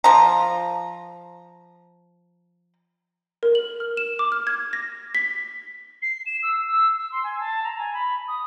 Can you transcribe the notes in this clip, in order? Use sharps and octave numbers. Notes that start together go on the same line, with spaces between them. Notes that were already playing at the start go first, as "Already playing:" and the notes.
F3 A#5
A#4
F#7
F6
E7
D6
F6
G#6
A#6
B6
C7
E7
E6
E6
E6
C6
G#5
A5
A#5
G#5
B5
D#6